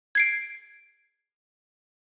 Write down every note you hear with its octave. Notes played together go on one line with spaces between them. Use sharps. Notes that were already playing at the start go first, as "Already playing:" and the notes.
G#6 C7 D7